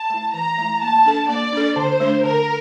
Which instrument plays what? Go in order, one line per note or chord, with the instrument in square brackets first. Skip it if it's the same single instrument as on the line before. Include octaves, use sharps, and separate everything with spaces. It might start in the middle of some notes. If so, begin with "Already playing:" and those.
Already playing: [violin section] A5
[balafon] A3 E4
[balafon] E3 [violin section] A#5
[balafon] A3 E4
[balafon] A#3 [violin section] A5
[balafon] D4 A4
[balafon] A#3 [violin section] D5
[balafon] D4 A4
[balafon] D3 [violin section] C5
[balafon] A3 D4
[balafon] D3 [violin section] A#4